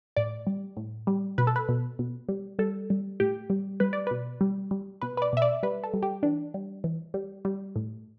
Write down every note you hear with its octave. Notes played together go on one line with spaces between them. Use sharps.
A2 D5
G3
A2
G3
B2 B4
A4
B4
B2
B2
G3
G3 A4
G3
A2 G4
G3
G3 B4
D5
B2 B4
G3
G3
B2 B4
B4
D5
B2 E5
D5
G3 B4
A4
G3
G4
E3 D4
G3
E3
G3
G3
A2